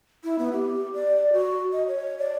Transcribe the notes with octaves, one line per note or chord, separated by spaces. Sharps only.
E4
B3
G4
D5
F#4
D#5
C#5
D5